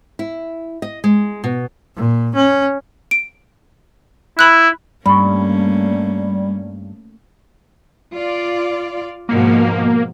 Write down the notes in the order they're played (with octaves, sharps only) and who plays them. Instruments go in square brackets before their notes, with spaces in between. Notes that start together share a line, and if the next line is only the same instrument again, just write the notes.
[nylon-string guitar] E4
D#5
G#3
B2
[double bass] A#2
C#4
[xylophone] D7
[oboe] E4 [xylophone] B5 F#6
[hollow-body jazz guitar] G2 [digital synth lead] G3 [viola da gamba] A3 A#3 C#4 [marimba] B5 C#6
[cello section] F4 D5
[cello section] G#2 B2 F3 [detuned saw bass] A#3